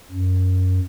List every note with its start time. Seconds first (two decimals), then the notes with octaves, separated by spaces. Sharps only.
0.11 F#2